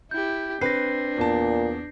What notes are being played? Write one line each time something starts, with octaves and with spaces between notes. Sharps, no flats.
E4 G4 G6
C4 D4 B4 A#6 C7
E2 A#2 A5